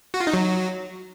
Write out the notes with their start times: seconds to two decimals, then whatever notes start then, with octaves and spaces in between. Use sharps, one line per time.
0.14 F#4
0.20 F4
0.27 D#4
0.34 F#3